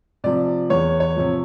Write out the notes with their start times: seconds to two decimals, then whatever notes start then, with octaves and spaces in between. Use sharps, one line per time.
0.24 C3 F3 D5
0.70 E2 C#5
1.00 C#5
1.16 C3 F3